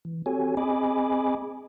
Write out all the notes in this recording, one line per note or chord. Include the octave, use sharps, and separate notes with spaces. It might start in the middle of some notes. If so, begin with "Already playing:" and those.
E3
C4 F#4 G4 A4 C#5 G#5
C4 G#4 D#5 G#5 B5 D6